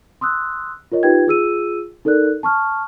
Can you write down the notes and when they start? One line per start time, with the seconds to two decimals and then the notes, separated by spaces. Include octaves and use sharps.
0.21 C6 D#6 E6 F#6
0.92 F4 A#4 C#5 D#5
1.03 D#4 F4 G4 B4 G5 G#6
1.26 F4 G#4 E6 D#7
2.05 D#4 A4 A#4 D5 F#6
2.43 A5 C#6 F6